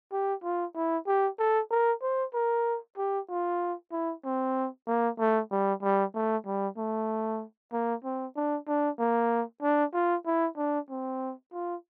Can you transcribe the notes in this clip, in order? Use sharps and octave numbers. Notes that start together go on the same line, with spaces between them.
G4
F4
E4
G4
A4
A#4
C5
A#4
G4
F4
E4
C4
A#3
A3
G3
G3
A3
G3
A3
A#3
C4
D4
D4
A#3
D4
F4
E4
D4
C4
F4